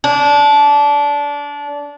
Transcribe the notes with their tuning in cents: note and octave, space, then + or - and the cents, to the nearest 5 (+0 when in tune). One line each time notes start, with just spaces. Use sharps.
D4 -20